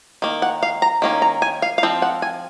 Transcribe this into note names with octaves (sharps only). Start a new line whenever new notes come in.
D#3 A#3
F#5
F5
A#5
D#3 A#3 C#4
A#5
G#5
F5
F5
F3 C4
F#5
G#5